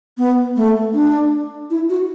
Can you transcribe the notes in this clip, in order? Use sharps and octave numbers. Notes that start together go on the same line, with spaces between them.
B3
A3
D4
E4
F#4